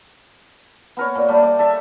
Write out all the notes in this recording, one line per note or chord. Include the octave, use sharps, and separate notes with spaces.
B3 A#4 C#5
A#2
G3 A3
D5
A4 E5